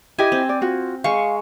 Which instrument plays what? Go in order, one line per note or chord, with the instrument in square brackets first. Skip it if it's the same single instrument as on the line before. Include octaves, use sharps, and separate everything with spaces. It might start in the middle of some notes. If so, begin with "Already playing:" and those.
[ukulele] E4 G4 D#5 [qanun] G#5
[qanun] C4
[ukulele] D5
F4 F#4
[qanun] G#3 C#6 [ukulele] F5